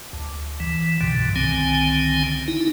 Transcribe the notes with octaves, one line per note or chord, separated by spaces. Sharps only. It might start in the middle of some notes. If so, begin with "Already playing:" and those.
D2
E3
C2 G2 B2 D3
C2 D3 D#3 C4 G#5
D#4 E4